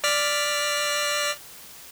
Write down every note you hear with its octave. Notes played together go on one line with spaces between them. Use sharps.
D5 F6 B6